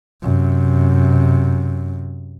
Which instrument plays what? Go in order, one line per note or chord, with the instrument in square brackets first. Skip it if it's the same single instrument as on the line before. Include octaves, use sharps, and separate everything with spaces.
[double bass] F#2 C3